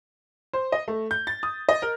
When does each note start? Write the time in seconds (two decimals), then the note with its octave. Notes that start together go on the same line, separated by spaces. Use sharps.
0.53 C5
0.72 D#5
0.88 A3
1.11 G6
1.27 A6
1.43 D#6
1.69 D#5
1.82 A#4